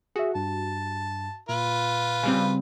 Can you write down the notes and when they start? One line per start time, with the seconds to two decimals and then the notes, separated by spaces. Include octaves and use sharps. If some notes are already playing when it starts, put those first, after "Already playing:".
0.16 F#4 G#4 E5
0.35 G2 A5
1.49 A#2 F4 B4
2.23 C#3 G3 C4